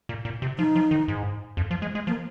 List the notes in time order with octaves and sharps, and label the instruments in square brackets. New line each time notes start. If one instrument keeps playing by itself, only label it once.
[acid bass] A#2
A#2
C3
[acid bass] F3 [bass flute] D#4
[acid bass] F3
D#3
G#2
F2
F3
G#3
G#3
[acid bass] F3 [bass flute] A#3